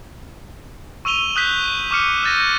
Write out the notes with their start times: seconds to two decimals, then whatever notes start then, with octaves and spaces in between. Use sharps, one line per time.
1.05 C#6 E6 D#7 F7 G7
1.36 D#6 F#6 G6 B6
1.91 C#6 D6 F6 C#7 D#7
2.23 E6 G6 A6 A#6 D#7